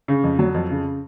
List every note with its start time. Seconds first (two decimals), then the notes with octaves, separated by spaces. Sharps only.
0.08 C#3
0.24 F2
0.39 F#3
0.54 F2
0.70 C#3